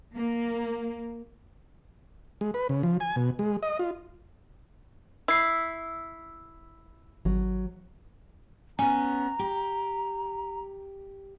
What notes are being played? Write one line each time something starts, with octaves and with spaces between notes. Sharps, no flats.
A#3
G#3
B4
C#3
F3
G#5
B2
G#3
D#5
F4
E4 E6 C7
G#1 F#3
B3 C#4 G#5 A#5
G4